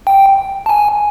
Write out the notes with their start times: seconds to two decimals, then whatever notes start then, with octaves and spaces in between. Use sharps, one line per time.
0.07 G5
0.66 A5
0.69 G#5